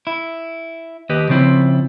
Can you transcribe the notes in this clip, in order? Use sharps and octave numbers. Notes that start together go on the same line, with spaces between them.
E4
D#2 G4 B4 D#5
C#3 F3 C4 E4